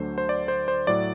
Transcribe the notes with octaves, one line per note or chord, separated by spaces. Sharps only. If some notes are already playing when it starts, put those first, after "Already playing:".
Already playing: D2 D3 F#3 A3 D4 C5
C5
D5
C5
C5
A2 F#3 D5